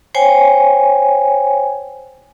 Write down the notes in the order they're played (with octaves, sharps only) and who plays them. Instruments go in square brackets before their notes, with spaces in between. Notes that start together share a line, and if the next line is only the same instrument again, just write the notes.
[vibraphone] C5 C#5 G5 G#5